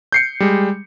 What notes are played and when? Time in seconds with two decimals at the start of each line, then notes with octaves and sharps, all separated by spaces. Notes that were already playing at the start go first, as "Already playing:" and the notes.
0.12 G6 C7 C#7
0.40 G3 G#3